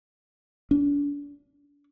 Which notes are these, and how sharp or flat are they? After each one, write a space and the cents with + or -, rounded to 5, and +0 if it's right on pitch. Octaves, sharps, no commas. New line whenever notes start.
D4 -35